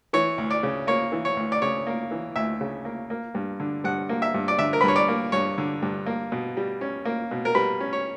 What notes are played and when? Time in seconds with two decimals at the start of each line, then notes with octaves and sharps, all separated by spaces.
0.13 E3 C#5
0.38 D2
0.51 D5
0.63 C#3
0.87 A#3 C#5
1.12 E3
1.25 C#5
1.37 D2
1.52 D5
1.62 C#3 C#5
1.87 A#3
2.11 E3
2.36 D2 E5
2.61 C#3
2.85 A#3
3.10 A#3
3.35 G2
3.60 D3
3.84 G2 F#5
4.09 A#3
4.22 E5
4.34 G2
4.48 D5
4.59 D3 E5
4.73 A#4
4.81 B4
4.84 G2 C#5
4.96 D5
5.08 A#3
5.32 G2 C#5
5.58 D3
5.82 G2
6.06 A#3
6.32 B2
6.57 G3
6.81 C#4
7.05 A#3
7.31 B2
7.45 A#4
7.55 G3 B4
7.80 C#4
7.93 C#5